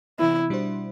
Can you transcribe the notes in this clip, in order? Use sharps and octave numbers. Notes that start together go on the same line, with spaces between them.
C3 E3 B3 E4
B2 G3 D4 F#4 C5